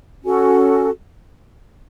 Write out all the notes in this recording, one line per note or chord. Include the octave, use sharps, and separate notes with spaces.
C#4 F#4 A4